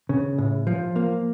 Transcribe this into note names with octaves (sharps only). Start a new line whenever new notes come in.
C#3
A2
F3
A#3